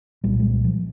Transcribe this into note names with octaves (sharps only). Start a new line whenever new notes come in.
C2 A#2 G3
G#3
G3
F3